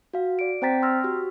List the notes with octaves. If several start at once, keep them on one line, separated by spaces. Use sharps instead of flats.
F#4 F5
D5 D7
C4 C5 G5 A#5 A6 B6
C6 E6 F6 A#6
F#4 G4